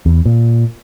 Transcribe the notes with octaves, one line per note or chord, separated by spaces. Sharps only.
E2
A#2